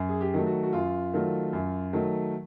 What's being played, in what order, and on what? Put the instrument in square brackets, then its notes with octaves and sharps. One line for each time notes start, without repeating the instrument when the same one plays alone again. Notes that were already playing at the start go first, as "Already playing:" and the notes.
Already playing: [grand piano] F#2
G#4
G4
D#3 F#3 A3
F#4
F#4
F#2 F4
D#3 F#3 A3
F#2
D#3 F#3 A3